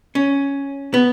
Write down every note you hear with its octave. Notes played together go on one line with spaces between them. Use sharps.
C#4
B3